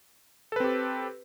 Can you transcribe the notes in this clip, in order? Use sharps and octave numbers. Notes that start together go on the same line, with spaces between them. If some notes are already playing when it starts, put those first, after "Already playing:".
C4 G4 A4 B4